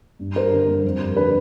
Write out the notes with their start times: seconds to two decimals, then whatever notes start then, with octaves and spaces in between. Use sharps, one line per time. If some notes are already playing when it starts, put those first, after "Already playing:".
0.19 G2
0.36 G3 A#4 C5
0.52 D3 A#4
0.68 G2
0.84 F2
1.01 G3
1.17 D3 B4